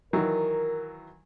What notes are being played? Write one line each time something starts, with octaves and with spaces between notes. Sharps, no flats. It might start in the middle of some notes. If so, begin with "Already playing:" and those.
D#3 E3 F#3 A#4